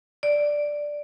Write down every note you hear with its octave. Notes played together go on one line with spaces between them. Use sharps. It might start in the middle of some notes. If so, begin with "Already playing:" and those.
D5